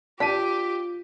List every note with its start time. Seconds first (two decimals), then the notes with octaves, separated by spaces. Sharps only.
0.20 D4 F4 G4 B6 D#7